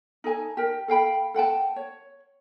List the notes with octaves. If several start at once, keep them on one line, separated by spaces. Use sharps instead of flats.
D#4 A4 G#5 A5
G4 A#4
A4 F5 G5 B5
A4 F#5 G5 A5
C#5